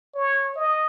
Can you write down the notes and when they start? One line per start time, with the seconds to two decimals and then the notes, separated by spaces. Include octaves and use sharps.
0.15 C#5
0.56 D#5